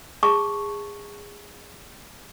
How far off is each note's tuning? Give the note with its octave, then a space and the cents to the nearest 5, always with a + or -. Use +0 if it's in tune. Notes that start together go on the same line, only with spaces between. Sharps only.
G#4 -20 A5 +0 C#6 +0